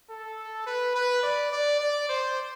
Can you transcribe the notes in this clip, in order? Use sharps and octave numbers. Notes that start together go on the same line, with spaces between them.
A4
B4
B4
D5
D5
D5
C5